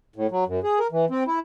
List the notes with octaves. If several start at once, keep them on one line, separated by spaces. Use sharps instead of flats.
A2
F#3
F#2
G#4
A#4
E3
C4
E4